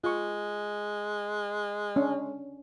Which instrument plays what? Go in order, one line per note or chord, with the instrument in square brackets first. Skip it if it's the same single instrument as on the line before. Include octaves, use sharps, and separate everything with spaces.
[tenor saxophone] G#3 [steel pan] F4 C#6
[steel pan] C#4 D4